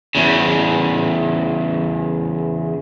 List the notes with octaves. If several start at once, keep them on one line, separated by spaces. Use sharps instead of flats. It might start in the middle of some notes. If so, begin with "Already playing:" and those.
E2 C#3